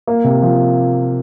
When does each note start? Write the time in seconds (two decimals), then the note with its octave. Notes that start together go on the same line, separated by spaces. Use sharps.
0.07 A#3
0.24 C3
0.43 F3